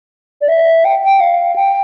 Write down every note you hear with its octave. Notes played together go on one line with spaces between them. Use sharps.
D5
E5
G5
G5
F5
G5